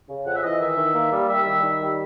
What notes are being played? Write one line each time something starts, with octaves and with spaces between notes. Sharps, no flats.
C#3
F2 F#5
E5
E3 D#5
D#3 E5
D#3
A#3
G3
G3 E5
D#3
D#3
G3